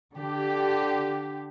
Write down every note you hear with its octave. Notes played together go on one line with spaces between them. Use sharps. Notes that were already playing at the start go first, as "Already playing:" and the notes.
D3 G4